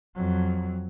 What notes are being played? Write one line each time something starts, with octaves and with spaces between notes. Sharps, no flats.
F2 F#3